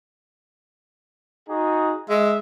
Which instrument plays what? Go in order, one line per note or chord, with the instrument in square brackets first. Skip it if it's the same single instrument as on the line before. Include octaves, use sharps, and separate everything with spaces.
[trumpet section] D#4 F#4 G#4
[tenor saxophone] G#3 [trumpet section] E5